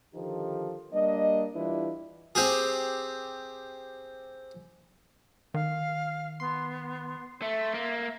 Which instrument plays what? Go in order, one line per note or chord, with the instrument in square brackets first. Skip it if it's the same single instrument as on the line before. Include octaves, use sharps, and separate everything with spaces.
[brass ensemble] D3 D#3 F3 D#4 G4 A4
G3 A#3 D4 D#5
E3 G3 D4 E4 F4 B4
[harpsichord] C4 G4 G#4
[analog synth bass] D#3 [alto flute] F5
[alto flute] B3 [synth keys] C6
[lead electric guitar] A3 [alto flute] E5
[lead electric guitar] A#3